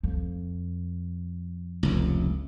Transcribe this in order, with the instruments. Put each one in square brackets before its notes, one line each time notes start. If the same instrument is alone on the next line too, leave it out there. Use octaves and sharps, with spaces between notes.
[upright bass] F2
[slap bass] F1 C#2